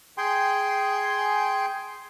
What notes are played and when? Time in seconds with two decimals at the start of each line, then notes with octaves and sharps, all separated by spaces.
0.18 G#4 G5 G#5 C6